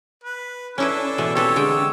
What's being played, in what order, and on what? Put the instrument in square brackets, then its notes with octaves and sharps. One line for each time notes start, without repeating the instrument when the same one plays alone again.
[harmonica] B4
[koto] C#4 E4 B4 [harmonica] D4 A4
[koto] B2 E3 A3
[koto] C4 A4 B4 [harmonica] G4 C#5 E6
[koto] D3 G#3 G5